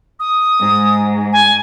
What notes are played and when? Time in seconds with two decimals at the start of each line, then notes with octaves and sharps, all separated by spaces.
0.20 D#6
0.60 G#2 G#3
1.32 G#5